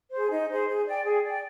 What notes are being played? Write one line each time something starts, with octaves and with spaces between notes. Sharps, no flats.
G#4 C5
D#4
G#4 C5
G#4
D5 G5
G#4
D5 G5